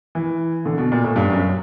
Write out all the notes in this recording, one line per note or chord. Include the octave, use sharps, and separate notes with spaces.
E3
D3
B2
A#2
A2
G2
F#2